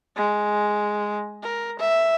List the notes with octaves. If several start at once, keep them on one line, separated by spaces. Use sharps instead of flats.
G#3
A#4
E5